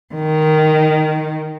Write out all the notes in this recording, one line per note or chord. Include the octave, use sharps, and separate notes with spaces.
D#3